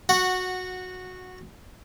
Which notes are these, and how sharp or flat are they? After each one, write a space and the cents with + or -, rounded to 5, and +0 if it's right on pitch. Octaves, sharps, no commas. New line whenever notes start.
F#4 -10 F#5 +0